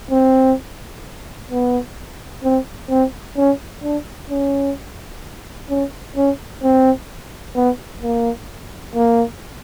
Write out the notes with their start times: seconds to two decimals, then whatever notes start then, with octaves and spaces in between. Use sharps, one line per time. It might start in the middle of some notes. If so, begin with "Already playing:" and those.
0.11 C4
1.50 B3
2.44 C4
2.90 C4
3.37 C#4
3.83 D4
4.30 C#4
5.70 C#4
6.16 C#4
6.63 C4
7.55 B3
8.02 A#3
8.95 A#3